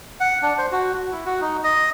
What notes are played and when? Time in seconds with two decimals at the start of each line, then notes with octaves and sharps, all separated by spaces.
0.20 F#5
0.42 D4
0.58 C5
0.72 F#4
0.94 F#4
1.12 E4
1.26 F#4
1.41 D#4
1.64 D#5